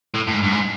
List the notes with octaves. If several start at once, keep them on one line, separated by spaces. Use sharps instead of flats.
A2
A2
G#2
G2
G#2